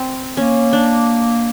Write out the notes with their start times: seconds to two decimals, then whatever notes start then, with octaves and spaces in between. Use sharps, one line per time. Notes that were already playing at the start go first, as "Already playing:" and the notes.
Already playing: C4
0.37 A#3 C#4
0.73 D4